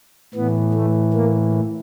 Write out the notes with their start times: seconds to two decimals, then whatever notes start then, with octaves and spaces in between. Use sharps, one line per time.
0.34 A2 E3 B3
0.74 A3
1.13 A#3